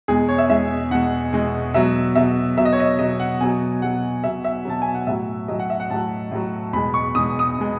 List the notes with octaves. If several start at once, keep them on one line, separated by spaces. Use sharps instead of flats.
E2 B2 G#3 G#4
C#5
E5
E2 B2 G#3 E5
E2 B2 G#3 F#5
E2 B2 G#3
B2 F#3 E5
B2 F#3 E5
B2 F#3 E5
D#5
C#5
D#5
B2 F#3 D#5
F#5
B2 F#3 G#5
B2 F#3 F#5
B2 F#3 E5
E5
B2 F#3 A5
G#5
F#5
A2 F#3 E5
A2 F#3 D#5
F#5
E5
F#5
A2 F#3 A5
A2 F#3
E2 B2 G#3 B5
C#6
E2 B2 G#3 D#6
D#6
B2 G#3